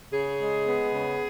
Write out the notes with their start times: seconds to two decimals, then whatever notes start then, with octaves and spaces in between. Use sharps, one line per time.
0.13 C#3 G#4
0.40 G#3
0.66 B3
0.93 C#3